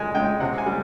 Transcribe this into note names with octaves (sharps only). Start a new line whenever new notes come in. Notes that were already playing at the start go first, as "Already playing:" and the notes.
Already playing: A#2 G#3 G#5
G#3 G5
C3 F#5
G#5
G3